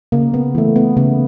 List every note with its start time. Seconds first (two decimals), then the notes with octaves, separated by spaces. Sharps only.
0.12 C#3 A#3
0.34 B3
0.55 E3 A3
0.76 B3
0.97 C#3 B3